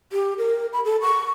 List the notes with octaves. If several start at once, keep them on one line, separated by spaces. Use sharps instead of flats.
G4
A#4
B5
A4
C#6